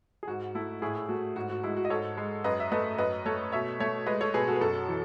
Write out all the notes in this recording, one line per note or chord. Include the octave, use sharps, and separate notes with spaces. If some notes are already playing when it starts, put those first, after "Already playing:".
G#4
G#2 F#4
A3 E4
A2 E4 G#4
E4
A3 F#4
G#2 F#4
F#4
G#3 E4
F#4
D#5
G#2 A4 C#5
G#3
F#2 B4 D#5
E5
A3 B4 D#5
F#2 B4 D#5
A3 A4 C#5
B2 C#5 E5
A3 C#5 E5
G#3 B4 D#5
A4 C#5
B2 G#4 B4
F#4 A4
B4
F#2 F#4 A4
E3